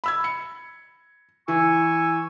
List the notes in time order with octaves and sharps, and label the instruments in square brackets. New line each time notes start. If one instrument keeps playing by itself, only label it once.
[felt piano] B5 E6 G#6
C#7
[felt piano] E3 [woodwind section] G#5 C#6 E6